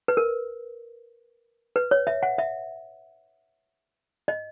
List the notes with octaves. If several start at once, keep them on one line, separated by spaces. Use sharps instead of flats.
B4
A#4
B4
C#5
E5
F#5
E5
D#5